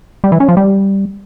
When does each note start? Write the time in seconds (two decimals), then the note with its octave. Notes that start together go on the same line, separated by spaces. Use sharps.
0.24 G3
0.32 E3
0.40 C#4
0.49 F3
0.57 G3